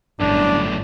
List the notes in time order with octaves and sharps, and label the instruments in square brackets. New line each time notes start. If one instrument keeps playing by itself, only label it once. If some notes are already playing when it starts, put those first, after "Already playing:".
[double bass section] G1 [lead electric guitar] F#2 A2 [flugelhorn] D4